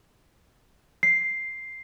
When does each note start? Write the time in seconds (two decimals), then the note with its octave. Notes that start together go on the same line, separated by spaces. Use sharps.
1.03 C7